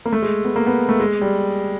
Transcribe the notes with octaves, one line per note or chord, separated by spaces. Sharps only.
A#3
A3
G#3
B3
A#3
B3
A3
G#3
G3